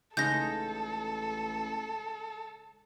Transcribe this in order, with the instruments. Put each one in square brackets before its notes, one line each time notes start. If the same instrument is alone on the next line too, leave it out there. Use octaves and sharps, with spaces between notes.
[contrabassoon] A1 [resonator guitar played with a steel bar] C#3 G#3 D#4 [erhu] A4 [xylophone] G6 A#6